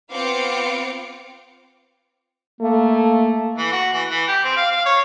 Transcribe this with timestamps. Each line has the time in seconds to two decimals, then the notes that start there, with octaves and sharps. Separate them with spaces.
0.11 B3 C4 F4 F5 D6 C#7
2.61 A3 A#3
3.58 E3
3.72 F#4
3.93 E3
4.09 E3
4.28 G4
4.44 C4
4.57 F5
4.72 F5
4.86 C#5